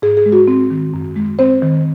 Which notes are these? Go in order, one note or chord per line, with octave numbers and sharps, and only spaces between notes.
G#2 G#4
G#4
G#3
F#4
C4
D#3
F#2
G#3
C4 C5
D#3